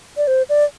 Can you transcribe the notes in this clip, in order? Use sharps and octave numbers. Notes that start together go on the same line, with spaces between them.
D5
C5
D5